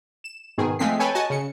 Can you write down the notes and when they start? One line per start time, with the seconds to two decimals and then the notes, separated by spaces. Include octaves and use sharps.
0.24 E7
0.58 G#2 B2 D#3 G#4
0.79 F3 G#3 A3 C4 B6 C7
0.99 A4 B4 C#5 G5 G#5
1.15 F#4 D#5 G#5 A5
1.30 C#3 C#7